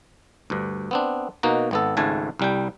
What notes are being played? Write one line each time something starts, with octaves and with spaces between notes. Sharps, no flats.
D2 G2
B3 C4 D4
B2 A#3 D#4 F#4
G#1 B3 A4
G#1 C#2 G#2 A3 G#5 A5
C2 G3 G5